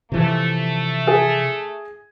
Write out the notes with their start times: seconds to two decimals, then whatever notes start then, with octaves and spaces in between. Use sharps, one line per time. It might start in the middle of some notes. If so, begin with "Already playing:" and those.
0.12 C3 E3 F3 A3
1.07 G#4